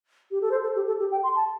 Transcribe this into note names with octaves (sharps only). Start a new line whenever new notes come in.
G4
A4
C5
A4
G4
A4
G4
G5
C6
A5